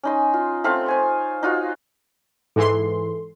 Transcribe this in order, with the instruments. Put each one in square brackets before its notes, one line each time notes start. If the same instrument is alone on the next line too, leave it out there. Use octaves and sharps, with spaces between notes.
[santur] C#4 D#4 C6
F4
A3 C4 F4 F5
C5 G#5 C#6
D#4 F4 F#4 F5
[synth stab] G#2 E3 C6 [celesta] A4